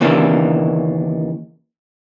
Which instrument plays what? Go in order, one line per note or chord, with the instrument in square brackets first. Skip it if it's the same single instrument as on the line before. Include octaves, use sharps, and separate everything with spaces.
[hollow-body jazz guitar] D#2 C#3 E3 A#3 D4